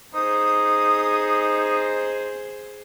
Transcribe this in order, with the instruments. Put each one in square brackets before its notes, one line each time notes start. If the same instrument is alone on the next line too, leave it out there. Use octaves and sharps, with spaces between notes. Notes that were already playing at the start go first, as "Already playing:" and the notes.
[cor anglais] D#4 [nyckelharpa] G#4 C5 [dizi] D#6